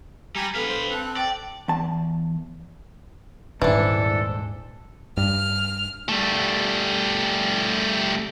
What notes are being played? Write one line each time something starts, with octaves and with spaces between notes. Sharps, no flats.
G3 G4 G#5 A#5
B3 A4 B4 F5 F6
C5
C4 A4 A5 F#6
D5 G5
E2 A5
D#1 G#2 E3 D4 A4 C5
G2 F6
G3 A3